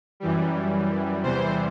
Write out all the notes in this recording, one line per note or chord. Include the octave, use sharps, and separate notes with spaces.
F#2 E3 G3
E2 C3 E3 G3 C5